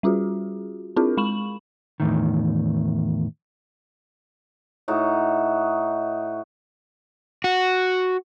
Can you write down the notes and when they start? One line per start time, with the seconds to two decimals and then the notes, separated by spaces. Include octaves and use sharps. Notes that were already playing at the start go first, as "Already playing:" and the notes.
0.03 G3 C#4 F4 F#4 G#4
0.96 C4 D4 E4 F4 G#4 A#4
1.17 G#3 B5 C#6 E7 F#7
2.00 E2 A2 D#3
4.88 A2 D#4 F#4
7.44 F#4